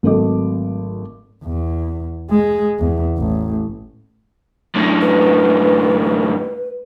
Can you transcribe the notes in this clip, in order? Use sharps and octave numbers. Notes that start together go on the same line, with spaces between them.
G#1 F#3 A3 A4 D#5 D6
E2
G#3
E2
A1
F#2 A2
B4